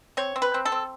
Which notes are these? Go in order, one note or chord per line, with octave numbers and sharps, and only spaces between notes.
C4 C#5
C4
B4
C4
A4
C4